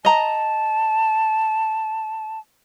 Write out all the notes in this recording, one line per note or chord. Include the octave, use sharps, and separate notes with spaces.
D#5 A5 A#5